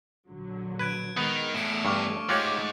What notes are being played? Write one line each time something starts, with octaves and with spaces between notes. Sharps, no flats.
A#1 D3 F#3
B4 F#6 G#6 D7
D#3 G#3 B3 D#6 F7
E2 A2 A3 C#7 D7 E7
G2 C#6 D6 F6
G#2 F4 G4 C#5 F#6 A6 F#7